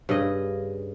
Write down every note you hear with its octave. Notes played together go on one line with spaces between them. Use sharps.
G2 C#3 G#4 D#5